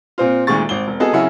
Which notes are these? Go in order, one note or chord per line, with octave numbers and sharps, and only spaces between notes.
A#2 C4 F4
D2 A#2 D#3 G#3 C#6 A6
G#1 G7
E1
B3 F#4 G#4 A4 D#5 A5
F#2 C#3 C#4 E4 F#5 G#5